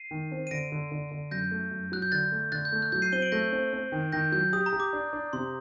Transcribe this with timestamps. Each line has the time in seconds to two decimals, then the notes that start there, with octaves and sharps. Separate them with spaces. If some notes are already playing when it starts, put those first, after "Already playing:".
Already playing: C7 D#7
0.11 D#3
0.32 C4
0.47 D#7
0.51 D3 A#6 D7
0.72 D3
0.92 D3
1.11 D3
1.31 F#2 G6 A#6
1.51 A3
1.71 F#2
1.92 F#3 F#6
2.02 G6
2.12 D3 F#6 A6
2.32 A3
2.52 D3 F#6 A6
2.65 G6
2.72 A3
2.82 F#6
2.92 F#3 G6
3.02 C7 D#7
3.12 C4 D#7 G7
3.22 D7 F#7
3.32 A3 G6 A#6
3.52 C4
3.73 C4
3.92 D#3
4.12 D#3 G6 A#6
4.32 F#3 G6
4.53 G4 D#6
4.66 A#5
4.72 G4
4.80 D6
4.93 D4
5.13 D4
5.33 C3 C6